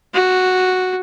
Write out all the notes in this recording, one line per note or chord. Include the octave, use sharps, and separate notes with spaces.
F#4